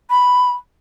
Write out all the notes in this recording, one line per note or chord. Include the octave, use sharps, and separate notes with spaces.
B5